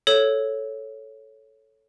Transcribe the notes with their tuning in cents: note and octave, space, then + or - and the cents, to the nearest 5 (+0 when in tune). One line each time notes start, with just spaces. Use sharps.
A4 -5 C#5 +0